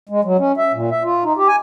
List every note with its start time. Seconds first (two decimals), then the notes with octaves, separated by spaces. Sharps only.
0.09 G#3
0.24 F#3
0.39 C#4
0.57 E5
0.74 A#2
0.91 E5
1.04 F4
1.24 D#4
1.37 G4
1.48 G#5